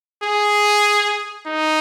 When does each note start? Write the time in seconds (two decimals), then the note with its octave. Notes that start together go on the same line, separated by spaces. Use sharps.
0.23 G#4
1.47 D#4